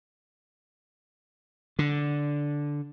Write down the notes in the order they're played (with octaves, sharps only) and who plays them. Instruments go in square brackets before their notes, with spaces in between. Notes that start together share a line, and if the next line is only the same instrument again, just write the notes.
[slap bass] D3